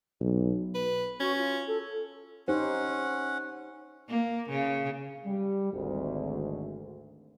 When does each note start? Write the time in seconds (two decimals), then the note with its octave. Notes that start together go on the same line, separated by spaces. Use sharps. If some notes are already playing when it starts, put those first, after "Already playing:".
0.20 B1
0.75 B4
1.20 C#4 F#4
1.37 F4
1.67 A4
2.48 C#4 D#4 G4 C5 F#5
4.08 A#3
4.49 C#3
5.25 G3
5.73 G#1 D2